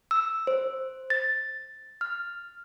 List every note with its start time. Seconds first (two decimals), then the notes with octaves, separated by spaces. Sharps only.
0.11 E6
0.47 C5
1.10 A6
2.01 F6